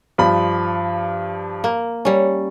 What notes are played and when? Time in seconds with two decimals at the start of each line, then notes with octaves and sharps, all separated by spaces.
0.18 G2 F3 B5
1.64 A#3
2.05 G3 C#4